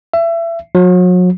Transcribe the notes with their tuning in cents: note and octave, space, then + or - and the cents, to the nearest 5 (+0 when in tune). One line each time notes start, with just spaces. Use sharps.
E5 +30
F#3 -35